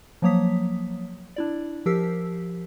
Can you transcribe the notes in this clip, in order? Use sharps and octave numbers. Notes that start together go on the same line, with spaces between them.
F3 F#3 A#3 C#5 D#6 B6
D4 E4 D5
F3 G4 A#4 E6 B6 C7